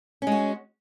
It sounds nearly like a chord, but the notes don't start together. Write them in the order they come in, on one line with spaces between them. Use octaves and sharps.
C#4 G#3 F#4